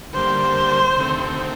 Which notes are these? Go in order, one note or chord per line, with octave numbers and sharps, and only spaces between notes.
D3 G3 A#3 C5
D2 C3 D#3 A3 C4